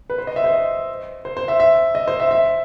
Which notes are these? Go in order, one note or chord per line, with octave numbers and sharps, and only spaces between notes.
B4
C5
D#5
E5
C5
D#5
C5
C5
E5
E5
D#5
C5
E5
E5